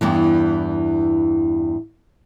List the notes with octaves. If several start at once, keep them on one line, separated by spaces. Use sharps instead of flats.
E2 G2 E3